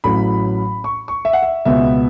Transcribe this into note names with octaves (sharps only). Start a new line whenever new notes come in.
A1 A2 F#3 C#4 B5
C#6
C#6
E5
F#5
E5
C#2 B2 B3 E5